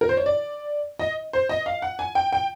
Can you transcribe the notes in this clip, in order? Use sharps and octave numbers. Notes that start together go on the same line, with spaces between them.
A#4
C5
C#5
D5
D#5
C5
D#5
F5
F#5
G#5
G5
G5